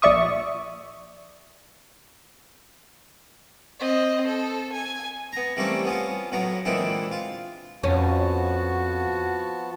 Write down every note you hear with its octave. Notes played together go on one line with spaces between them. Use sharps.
A#1 D5 E5 C#6 D#6
C4 D#5
A4
G#5
B3 A#5
E3 G3 A3 A#3 C4 C#4
B3 C#4 F4
A2 F#3 B3 A#5
A#2 D3 E3 G#3 C4 E4
F4
F2 F3 B3 C#4 F#4 A5